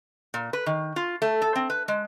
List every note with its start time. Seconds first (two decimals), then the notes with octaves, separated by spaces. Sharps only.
0.34 A#2
0.53 B4
0.66 D#3
0.96 F4
1.22 A3
1.42 A4
1.56 C4
1.70 B4
1.88 G#3